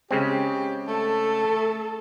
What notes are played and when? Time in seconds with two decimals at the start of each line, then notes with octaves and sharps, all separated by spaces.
0.11 C#3 G#3 C4 G4
0.87 A3 A4